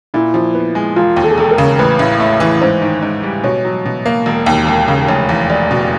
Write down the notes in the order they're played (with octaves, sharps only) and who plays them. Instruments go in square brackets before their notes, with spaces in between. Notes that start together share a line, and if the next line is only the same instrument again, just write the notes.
[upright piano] A#2 [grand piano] E4
[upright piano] F3
B3
G#3
[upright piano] E1 [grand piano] F4
[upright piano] D#2
[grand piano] A4
G#4
[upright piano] E1 [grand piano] A4
[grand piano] A#4
[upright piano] C#3
[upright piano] A1 [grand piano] B4
[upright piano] A2
A3
E3
[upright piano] G#2 [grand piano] C5
[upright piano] D#3
G#2
G3
[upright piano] B2 [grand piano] C#5
[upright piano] F#3
B2
A#3
E1
D#2
E1
C#3
[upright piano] F1 [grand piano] C#5
[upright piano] E2
[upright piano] F1 [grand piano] D5
[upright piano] B2